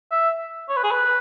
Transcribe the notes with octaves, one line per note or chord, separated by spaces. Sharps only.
E5
C#5
B4
G#4
B4